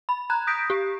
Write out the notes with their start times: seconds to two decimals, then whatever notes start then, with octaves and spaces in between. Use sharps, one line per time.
0.09 B5
0.30 A#5 F#6 G#6
0.47 D#6 G6 A#6 B6 D7
0.70 G4